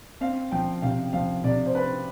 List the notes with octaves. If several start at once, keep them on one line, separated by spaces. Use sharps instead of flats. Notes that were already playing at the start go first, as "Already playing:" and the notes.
C4 F5
F3 G5
C3 F5
F3 F5
C3 D5
C5
C4 B4